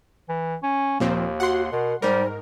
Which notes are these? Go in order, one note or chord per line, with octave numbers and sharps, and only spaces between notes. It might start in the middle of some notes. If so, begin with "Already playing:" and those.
E3
C#4
D#2 A#2 F3 C4
F#4 F#5 C6
B2 A#4
G#2 G3 A#4 C5